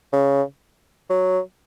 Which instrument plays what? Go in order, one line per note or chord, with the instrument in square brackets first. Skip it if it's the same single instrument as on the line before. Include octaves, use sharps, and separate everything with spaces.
[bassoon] C#3
F#3